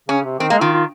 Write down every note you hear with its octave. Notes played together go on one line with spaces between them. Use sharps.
C#3 C#4
C3
D#3 C4
G#3 A#3
D#3 F4
F4